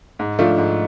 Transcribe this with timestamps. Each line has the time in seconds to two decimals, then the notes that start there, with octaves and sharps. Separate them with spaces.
0.19 G#2
0.39 F3 A3 D4 F4
0.58 G#2